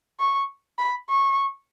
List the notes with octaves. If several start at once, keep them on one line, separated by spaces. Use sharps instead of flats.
C#6
B5
C#6